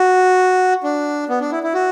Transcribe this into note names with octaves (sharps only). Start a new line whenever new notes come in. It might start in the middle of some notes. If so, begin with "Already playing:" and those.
Already playing: F#4
D4
B3
D4
E4
E4
F#4